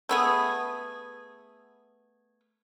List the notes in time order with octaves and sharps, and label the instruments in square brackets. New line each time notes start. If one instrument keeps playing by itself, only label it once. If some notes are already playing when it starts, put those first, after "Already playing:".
[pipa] A3 B3 G#4